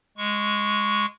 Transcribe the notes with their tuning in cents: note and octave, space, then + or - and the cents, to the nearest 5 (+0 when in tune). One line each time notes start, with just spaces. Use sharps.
G#3 -5 C#6 +0